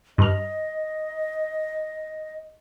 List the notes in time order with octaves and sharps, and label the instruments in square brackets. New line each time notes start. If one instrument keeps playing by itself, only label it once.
[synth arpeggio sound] G2 F6 [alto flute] D#5